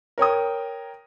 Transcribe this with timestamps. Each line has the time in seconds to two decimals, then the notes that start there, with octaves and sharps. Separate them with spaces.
0.18 A#4 C#5 G5 D#6